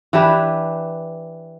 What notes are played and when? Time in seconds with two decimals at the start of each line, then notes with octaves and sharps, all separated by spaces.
0.13 E3 D4 G4 B4